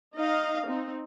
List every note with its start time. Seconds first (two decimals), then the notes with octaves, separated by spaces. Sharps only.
0.16 D#4 D#5 F5
0.67 C4 D#4